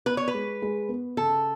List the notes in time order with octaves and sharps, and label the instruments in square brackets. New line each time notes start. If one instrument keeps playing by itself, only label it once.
[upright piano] B3 [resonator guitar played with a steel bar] B4
[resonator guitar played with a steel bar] C#5
B4
[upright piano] G#3
G#3
B3
[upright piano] C#3 [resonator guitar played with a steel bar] A4